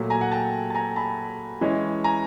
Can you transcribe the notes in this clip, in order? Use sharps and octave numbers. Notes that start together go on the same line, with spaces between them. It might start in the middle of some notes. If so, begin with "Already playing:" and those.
Already playing: A#2 F#3 A3
G#5 A#5
F#5 G#5
G5 A5
A5
G#5 A#5
A5 B5
E3 G#3 C#4
G#5 A#5